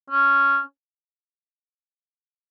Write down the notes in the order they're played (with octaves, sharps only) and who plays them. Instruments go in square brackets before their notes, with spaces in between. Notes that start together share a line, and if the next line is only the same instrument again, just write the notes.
[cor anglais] C#4